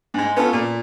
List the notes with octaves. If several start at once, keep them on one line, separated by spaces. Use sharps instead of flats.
G#2 G#3
B3 C#4 F4 A4
A#2